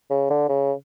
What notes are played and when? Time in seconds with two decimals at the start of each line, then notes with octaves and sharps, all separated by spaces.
0.10 C#3
0.30 D3
0.48 C#3